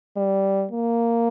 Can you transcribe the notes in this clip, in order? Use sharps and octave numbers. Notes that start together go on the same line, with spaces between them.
G3
A#3